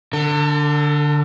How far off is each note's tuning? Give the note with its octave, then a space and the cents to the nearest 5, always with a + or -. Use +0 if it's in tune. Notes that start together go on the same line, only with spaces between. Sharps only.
D3 +0 A4 +45